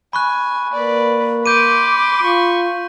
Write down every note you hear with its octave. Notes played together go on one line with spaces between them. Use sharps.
G#5 B5 C#6 F#6
A#3 B4 D5
B5 C6 D6 G6 D#7
F4 C#6